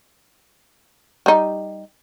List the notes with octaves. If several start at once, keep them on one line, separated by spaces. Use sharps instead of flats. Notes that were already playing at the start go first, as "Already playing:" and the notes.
G3 D#4